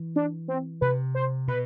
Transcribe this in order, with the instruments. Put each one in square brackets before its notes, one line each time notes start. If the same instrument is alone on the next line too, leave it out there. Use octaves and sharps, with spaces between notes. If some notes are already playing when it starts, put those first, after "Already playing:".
Already playing: [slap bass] E3
[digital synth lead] D4
C4
[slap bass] C3 [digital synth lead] B4
[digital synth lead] C5
[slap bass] B2 [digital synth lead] B4